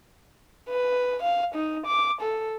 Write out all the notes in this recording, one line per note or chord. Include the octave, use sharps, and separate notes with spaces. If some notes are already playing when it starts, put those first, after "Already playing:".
B4
F5
D#4
D6
A4